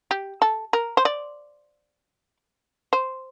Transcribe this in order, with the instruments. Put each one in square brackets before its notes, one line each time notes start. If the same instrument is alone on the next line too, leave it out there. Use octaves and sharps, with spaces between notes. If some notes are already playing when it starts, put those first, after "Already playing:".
[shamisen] G4
A4
A#4
C5
D5
C5